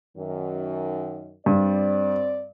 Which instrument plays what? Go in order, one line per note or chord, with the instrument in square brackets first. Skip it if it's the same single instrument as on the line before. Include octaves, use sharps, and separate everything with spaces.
[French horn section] F#2 D#3
[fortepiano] G2 [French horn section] C4 D5